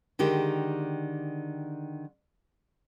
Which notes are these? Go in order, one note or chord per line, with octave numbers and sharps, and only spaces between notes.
D3 D#3 G#3 G4